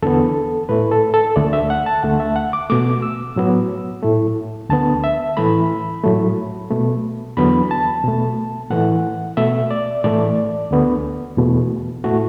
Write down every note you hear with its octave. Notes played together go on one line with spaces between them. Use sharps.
E2 D3 B3 A4
A2 A3 B4
A4
A4
D2 D3 A3 D5
E5
F#5
A5
D2 D3 A3 F#5
E5
F#5
D6
B2 A3 D6
E6
A2 F#3 B3
A2 A3
D2 D3 B3 A5
E5
A2 E3 A3 B5
A2 F#3 A3
B2 A3
E2 D3 F#3 B3 B5
A5
B2 A3
A2 E3 A3 F#5
B2 A3 E5
D5
A2 E3 A3 D5
D2 D3 B3
E2 B2 A3
A2 A3 F#4